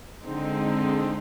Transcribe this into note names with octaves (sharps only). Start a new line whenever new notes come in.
D3 G#3 C4 D#4